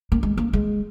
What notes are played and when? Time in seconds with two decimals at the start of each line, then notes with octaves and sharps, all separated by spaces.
0.12 A#3
0.23 G#3
0.37 A#3
0.53 G#3